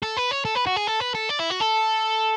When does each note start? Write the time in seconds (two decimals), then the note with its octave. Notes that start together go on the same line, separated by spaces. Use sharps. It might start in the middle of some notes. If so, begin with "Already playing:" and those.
0.02 A4
0.17 B4
0.31 C#5
0.45 A4
0.55 B4
0.67 F#4
0.76 G#4
0.87 A4
1.00 B4
1.15 A4
1.30 D5
1.40 E4
1.51 F#4
1.61 A4